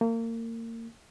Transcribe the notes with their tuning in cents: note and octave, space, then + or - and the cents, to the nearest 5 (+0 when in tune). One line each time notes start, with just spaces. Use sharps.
A#3 -30